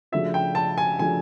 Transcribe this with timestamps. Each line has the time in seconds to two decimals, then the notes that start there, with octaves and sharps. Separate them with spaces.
0.12 C#3 F3 A3 D4 F#4 E5
0.34 G5
0.55 A5
0.78 G#5
0.99 C#3 F3 A3 D4 F#4 G#5